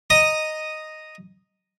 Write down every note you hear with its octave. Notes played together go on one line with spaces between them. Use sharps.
D#5 A#5 D#6